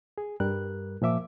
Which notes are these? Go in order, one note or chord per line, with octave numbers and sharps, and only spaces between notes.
G#4
G2 G3 A#4 F#6
A#2 F3 E5 D6